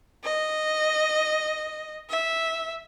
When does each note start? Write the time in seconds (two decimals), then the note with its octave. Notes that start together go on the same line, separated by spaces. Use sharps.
0.24 D#5
2.09 E5